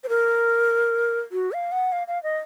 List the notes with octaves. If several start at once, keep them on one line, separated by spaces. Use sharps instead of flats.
C5
A#4
F#4
F5
F#5
F5
F5
D#5